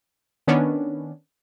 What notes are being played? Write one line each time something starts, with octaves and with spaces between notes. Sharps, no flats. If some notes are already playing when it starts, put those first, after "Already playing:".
D#3 B3 C#4 D4